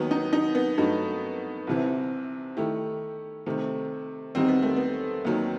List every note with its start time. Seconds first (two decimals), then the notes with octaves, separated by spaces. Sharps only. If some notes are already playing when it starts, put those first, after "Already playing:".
Already playing: D#2 D#3 F#3 B3
0.11 D#4
0.33 D#4
0.55 B3
0.77 G2 F#3 A3 D#4
1.67 C2 C3 E3
2.57 D#3 A3 E4 G4
3.46 C3 D#3 A3
4.35 E2 D#3 G3 C4 D#4
4.48 B3
4.63 A3
4.76 B3
5.25 D#2 D#3 F#3